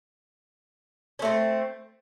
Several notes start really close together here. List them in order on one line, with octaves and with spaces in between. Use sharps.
C#4 A3 C4